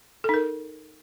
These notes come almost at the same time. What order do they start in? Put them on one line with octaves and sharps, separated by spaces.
A4 D#4 A#4